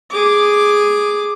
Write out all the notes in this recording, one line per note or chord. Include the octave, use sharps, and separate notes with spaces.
G#4 D6